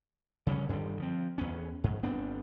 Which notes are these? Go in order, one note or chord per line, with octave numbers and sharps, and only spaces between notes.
C#3 G3 A#3 C#4
G2 D3 D#3 G3
F3 C4
E2 B3 C#4
G#2
G1 B3 C4 D4